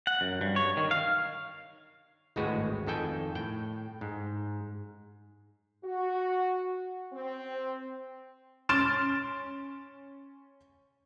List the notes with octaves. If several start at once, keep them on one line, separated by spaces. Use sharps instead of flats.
F#5
F#2
G2
C#5
D#3
F5
G#1 D2 A2 G#3 F#4 B4
F2 D#3 A4 G5 G#5
A2 G5
G#2
F#4
C4
C#4 C6 F6 A6 D7 E7